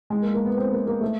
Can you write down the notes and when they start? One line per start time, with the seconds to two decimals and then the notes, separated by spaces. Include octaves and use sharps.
0.10 G#3
0.22 A#3
0.34 A#3
0.45 B3
0.57 C4
0.71 A#3
0.86 A#3
1.01 A3